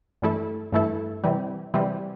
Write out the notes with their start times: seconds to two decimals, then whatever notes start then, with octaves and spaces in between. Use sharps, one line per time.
0.22 G2 E3 A3 E4 A4
0.72 G2 E3 A3 E4 A4
1.24 C3 E3 G3
1.74 C3 E3 G3